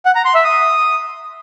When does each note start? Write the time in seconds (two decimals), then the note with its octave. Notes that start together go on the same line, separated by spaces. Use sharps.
0.06 F#5
0.15 A#5
0.25 C6
0.35 E5
0.44 D#6